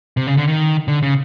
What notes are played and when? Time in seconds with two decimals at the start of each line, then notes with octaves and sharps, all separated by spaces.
0.17 C3
0.27 C#3
0.37 D3
0.48 D#3
0.88 D3
1.03 C#3